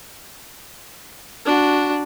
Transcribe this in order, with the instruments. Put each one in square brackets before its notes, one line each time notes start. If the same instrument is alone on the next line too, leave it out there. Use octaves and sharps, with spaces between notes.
[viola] D4 F#4